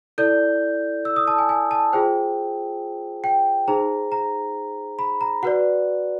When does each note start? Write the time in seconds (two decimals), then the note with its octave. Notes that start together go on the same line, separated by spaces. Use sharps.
0.18 E4 A4 D5 G6
1.05 E6
1.16 D#6
1.28 A5
1.38 G#5
1.49 G#5
1.71 A5
1.93 F4 G#4 C5 G5
3.24 G5
3.68 D#4 G#4 C5 A#5
4.12 A#5
4.99 B5
5.21 A#5
5.43 F#4 B4 D5 F#5